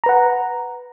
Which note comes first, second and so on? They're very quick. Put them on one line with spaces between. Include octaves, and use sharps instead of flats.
A#5 B4 F#5